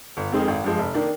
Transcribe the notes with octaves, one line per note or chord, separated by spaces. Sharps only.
G1
F2 D#3 G#3 C4
G#1
G2 F3 G#3
F1
D#3 A#3 D4